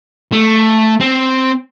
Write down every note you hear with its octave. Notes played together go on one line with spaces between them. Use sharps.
A3
C4